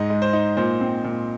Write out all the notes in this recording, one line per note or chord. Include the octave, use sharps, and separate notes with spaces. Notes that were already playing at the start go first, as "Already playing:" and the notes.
Already playing: G#2 D#5
G#3
C5
D#4
A#2 C5
C4
A#2